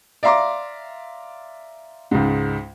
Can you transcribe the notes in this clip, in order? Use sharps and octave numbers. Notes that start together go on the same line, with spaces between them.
D5 E5 F5 A#5 C6 D6
C#2 G#2